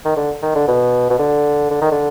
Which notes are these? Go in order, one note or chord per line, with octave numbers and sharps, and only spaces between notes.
D#3
D3
D#3
D3
B2
B2
D3
D3
D#3
D3